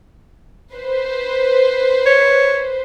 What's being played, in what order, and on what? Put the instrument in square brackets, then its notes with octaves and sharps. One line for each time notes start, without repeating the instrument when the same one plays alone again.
[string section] B4 C5
[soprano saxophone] C#5